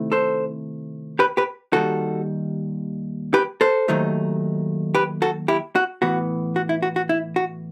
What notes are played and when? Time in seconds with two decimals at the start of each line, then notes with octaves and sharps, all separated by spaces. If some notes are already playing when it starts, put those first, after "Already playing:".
Already playing: C3 D#3 A3 E4
0.12 A4 C5
1.19 G4 B4
1.37 G4 B4
1.73 D#2 D#3 G3 F#4 A4
3.34 G4 B4
3.61 A4 C5
3.88 D#2 D#3 F#3 A3 D#4
4.95 G4 B4
5.22 F#4 A4
5.48 E4 G4
5.76 F#4
6.02 A2 E3 B3 F#4
6.56 F#4
6.69 E4
6.82 F#4
6.96 F#4
7.09 E4
7.36 F#4